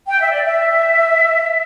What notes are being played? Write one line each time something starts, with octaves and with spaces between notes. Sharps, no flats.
G5
E5
D5
E5